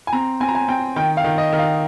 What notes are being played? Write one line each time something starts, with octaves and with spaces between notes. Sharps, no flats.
G#5
C4 A#5
C4 G#5
A#5
G#5
C4 G5
D#3 G5
F5
D#3
D#5
D#3
F5